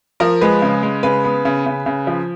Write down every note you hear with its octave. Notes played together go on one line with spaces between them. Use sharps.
F3 A#4
G#3 B4
C#3
G#3
C#3 B4
B3
C#3
C#3
C#3
F3